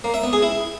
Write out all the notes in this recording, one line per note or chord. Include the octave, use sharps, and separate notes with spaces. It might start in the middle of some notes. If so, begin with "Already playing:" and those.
A#3
E5
B3
G#4
E4